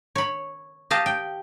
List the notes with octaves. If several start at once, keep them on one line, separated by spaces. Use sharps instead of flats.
C#5 B5
G4 D#5 F5 A5
G5